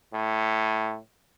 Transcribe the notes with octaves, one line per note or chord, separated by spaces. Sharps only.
A2